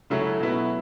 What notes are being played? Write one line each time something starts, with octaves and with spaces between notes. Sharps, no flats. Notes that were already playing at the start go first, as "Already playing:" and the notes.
C#3 F#3 A3 C#4 E4
B2 F#3 B3 E4